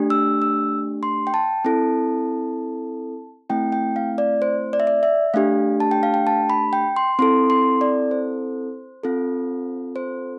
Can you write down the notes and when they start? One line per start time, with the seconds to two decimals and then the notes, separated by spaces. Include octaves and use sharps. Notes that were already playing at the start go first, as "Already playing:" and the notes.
Already playing: A3 D4 G4
0.10 E6
0.42 E6
1.03 C6
1.27 G5
1.34 A5
1.65 C4 E4 A4
3.50 A3 C4 E4 G5
3.72 G5
3.96 F5
4.18 D5
4.42 C5
4.73 D5
4.80 E5
4.87 D5
5.03 E5
5.34 A3 D4 G4 F5
5.80 A5
5.91 G5
6.03 F5
6.14 G5
6.27 A5
6.50 B5
6.73 G5
6.96 C6
7.19 C4 E4 A4 C6
7.50 C6
7.81 D5
8.11 C5
9.04 C4 F4 A4
9.96 C5